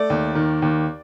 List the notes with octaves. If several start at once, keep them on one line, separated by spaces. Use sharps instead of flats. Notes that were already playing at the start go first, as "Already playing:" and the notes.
Already playing: A3 D5
D#2
D#3
D#2